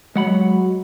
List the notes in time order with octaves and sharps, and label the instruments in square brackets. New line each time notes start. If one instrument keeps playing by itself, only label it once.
[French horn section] F#3 [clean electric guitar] G#3 F#5 B5